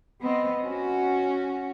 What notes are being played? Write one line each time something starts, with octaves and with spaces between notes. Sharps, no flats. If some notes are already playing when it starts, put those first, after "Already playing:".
B3 C4 D#5
C#4 F#4